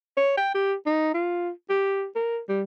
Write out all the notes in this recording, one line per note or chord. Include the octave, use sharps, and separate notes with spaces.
C#5
G5
G4
D#4
F4
G4
A#4
G3